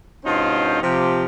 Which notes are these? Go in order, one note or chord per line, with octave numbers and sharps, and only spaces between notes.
G2 B2 C#4 D#4 F4 C5
C3 F3 G4